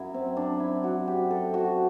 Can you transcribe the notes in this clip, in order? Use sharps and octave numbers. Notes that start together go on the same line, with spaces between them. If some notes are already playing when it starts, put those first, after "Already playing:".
Already playing: F#2 F#3 E4
C4
D4
E4
F#4
G4
A4
F#4